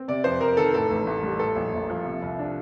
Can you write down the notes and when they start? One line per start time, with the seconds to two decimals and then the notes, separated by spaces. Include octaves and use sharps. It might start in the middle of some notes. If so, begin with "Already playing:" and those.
Already playing: C4
0.08 C3 D5
0.24 F2 C5
0.41 F2 A#4
0.57 D#3 A4
0.74 A2 A4
0.90 A1
1.07 A1
1.23 G3
1.39 A2 A4
1.56 A#1
1.73 A#1
1.90 F3
2.05 C3
2.22 C2
2.39 D4